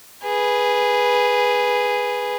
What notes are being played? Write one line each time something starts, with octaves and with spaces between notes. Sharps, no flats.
G#4 B4